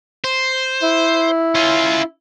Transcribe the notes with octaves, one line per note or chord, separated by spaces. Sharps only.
C5
E4
C#4 F4